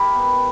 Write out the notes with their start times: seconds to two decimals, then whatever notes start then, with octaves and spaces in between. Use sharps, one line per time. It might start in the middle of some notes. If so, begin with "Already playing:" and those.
Already playing: E4 G4 A#4
0.14 B3